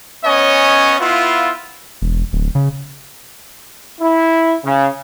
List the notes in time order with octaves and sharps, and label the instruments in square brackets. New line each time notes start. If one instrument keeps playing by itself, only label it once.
[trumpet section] B3 C#4 C#5 D#5 G#5
B3 E4 F4
[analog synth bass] E1
D1
C#3
[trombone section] E4
C#3